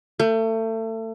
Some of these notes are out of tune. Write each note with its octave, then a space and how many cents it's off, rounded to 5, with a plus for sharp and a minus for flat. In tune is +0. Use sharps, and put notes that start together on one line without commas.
A3 +30